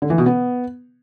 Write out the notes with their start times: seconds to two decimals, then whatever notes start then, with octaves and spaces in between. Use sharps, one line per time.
0.02 D3
0.10 E3
0.18 B2
0.26 B3